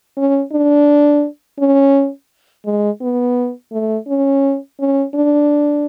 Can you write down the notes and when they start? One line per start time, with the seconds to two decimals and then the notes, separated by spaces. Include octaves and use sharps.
0.17 C#4
0.52 D4
1.59 C#4
2.65 G#3
3.01 B3
3.72 A3
4.08 C#4
4.80 C#4
5.14 D4